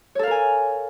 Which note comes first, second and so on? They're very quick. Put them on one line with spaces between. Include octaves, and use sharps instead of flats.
C#5 A4 F5 A#4 G#5